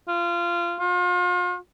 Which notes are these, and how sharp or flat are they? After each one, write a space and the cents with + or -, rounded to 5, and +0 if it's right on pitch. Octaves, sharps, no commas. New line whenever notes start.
F4 -20
F4 +40